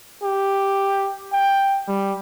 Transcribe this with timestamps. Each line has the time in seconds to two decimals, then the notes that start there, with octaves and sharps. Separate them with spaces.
0.24 G4
1.33 G5
1.88 G3